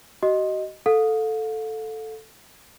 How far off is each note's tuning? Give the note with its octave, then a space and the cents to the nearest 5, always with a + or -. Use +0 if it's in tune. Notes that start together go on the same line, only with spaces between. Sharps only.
F#4 +40 D#5 +0
A4 +0 F5 +40